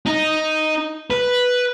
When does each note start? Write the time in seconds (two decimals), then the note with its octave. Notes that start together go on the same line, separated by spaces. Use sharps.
0.06 D#4
1.11 B4